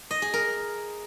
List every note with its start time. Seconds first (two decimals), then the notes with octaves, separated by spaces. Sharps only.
0.11 D#5
0.22 G#4
0.34 A#4